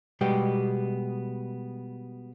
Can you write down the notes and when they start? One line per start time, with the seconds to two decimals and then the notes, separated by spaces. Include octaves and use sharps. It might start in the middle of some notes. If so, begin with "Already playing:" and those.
0.21 B2 G3 G#3 B3 G4